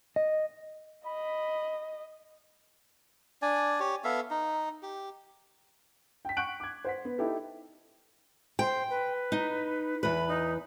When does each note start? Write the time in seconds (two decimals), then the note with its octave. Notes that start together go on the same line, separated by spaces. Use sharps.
0.16 D#5
1.06 D#5 B5
3.42 D4 D5 G#5
3.80 G4 C#5
4.04 B3 A4 E5 F5
4.31 D#4
4.83 G4
6.25 G5 B6
6.37 F#5 C#6 F#6 G6 D7 F#7
6.60 D6 G#6
6.85 C5 F#5 B6
7.05 B3
7.18 D#4 E4 G4 A4
8.59 C5 G5
8.89 B4
9.32 D#4
10.03 E2 B4 B5
10.28 D#4